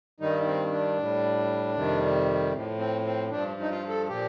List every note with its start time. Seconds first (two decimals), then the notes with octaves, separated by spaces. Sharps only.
0.20 G2 D#3 G3 D#4
0.46 C4
0.72 D4
0.98 A2 G3
1.75 F2 C3 D#3 G3
2.53 A2 F3
2.79 C4
3.05 C4
3.30 G2 F3 D4
3.61 D#4
3.70 F4
3.89 A4
4.08 A#2 F3 G4